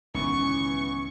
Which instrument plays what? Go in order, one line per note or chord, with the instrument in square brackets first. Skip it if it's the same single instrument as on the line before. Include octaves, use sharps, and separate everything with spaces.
[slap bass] C#2 A2 D#3 [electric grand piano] E3 B3 [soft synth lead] C#4 [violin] C#6